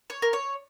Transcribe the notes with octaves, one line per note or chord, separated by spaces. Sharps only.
C#5
A#4
C#5